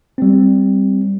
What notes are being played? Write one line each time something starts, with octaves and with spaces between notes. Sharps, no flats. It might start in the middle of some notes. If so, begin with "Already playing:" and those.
G3 C4